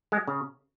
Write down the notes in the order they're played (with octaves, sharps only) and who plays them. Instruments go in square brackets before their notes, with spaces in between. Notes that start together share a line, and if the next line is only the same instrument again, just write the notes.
[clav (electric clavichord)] G#3
C#3